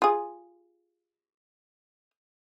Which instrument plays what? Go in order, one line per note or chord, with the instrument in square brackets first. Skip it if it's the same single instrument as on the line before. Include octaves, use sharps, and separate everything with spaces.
[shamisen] F4 G#4